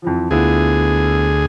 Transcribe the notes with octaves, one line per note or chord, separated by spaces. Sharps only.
F2 E3 F3
D2 B3 E4 F4 G#4